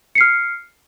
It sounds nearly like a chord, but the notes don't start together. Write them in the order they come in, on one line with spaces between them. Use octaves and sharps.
C#7 C7 F6